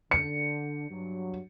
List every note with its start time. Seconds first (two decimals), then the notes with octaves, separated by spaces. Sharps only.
0.11 D3 C#7
0.91 G2 F#3